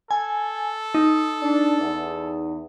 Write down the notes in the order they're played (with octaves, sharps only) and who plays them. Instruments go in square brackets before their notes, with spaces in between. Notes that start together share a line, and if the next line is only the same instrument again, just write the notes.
[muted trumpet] A4 [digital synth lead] G#5
[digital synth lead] D#4
[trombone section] D4
E2